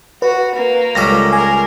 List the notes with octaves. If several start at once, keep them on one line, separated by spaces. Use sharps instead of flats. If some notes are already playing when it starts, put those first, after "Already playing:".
F#4 B4
A#3
C#2 G3 A4 A#6
G#4 A#4 G#5